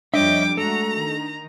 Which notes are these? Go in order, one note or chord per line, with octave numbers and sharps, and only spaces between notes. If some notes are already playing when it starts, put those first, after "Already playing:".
F2 G3 D4 C#5 D#5 E5 G5 D6
G#3 A3 F#4 A4 A#5
D#3